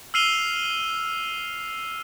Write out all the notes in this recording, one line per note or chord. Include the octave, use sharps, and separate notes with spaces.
E6 F6 C7 D#7 F7 G7